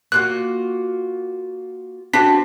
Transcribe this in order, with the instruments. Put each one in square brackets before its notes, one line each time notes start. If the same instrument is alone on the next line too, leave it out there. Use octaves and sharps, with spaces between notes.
[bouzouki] A#3 F4 F#4 [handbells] F#6
[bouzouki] B3 C4 [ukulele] D4 F#4 [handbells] B6